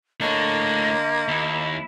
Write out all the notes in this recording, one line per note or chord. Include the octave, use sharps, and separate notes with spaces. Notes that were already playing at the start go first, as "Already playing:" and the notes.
D3 A3 A#3 D4 C#5 D#5
D#2 E4